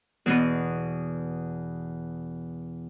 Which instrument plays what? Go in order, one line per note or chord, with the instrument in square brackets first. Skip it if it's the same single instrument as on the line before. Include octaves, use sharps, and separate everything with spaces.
[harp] E2 B2 B3